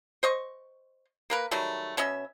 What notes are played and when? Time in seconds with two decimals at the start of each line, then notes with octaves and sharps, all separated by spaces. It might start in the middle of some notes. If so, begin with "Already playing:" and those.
0.23 C5 D#5 C#6
1.30 A#3 A#4 B4
1.51 D#3 F#3 G3 A3
1.97 B2 C#4 D#5 E5